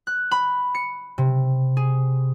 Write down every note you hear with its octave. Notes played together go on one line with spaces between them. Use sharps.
F#6
B5
C#7
C3
G#4